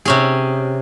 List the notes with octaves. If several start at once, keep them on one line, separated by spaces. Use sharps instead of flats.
C3 C#4 G#4